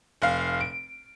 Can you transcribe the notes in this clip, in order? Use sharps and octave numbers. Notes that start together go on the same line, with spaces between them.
F1 F5
D7